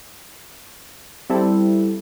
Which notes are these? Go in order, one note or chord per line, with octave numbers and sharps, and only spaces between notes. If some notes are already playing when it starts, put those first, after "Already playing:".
G3 C4 E4 A4